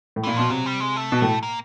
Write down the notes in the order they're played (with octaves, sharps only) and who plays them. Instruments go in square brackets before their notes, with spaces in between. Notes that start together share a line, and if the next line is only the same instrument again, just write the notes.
[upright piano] A2
[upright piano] A#2 [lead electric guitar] E3
[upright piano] B2 [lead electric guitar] F3
[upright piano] C3 [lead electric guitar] F#3
[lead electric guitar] G3
G#3
A3
[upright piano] B2
A2
[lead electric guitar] A#3